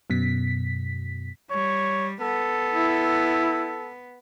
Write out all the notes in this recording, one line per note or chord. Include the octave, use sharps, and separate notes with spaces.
F#2 B2 B6
G3 C#5
B3 A4
E4